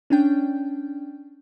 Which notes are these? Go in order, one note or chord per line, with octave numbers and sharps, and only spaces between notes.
C#4 D4 G5